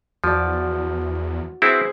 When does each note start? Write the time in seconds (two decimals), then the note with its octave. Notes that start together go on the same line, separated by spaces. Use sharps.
0.24 E2 F3 F#4 D5
1.62 C4 E4 F#4 G#4 B4 C5